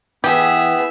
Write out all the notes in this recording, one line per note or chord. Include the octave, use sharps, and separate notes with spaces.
E3 B3 G4 G#4 E5